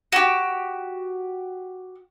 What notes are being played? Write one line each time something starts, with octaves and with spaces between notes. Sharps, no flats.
F#4 G4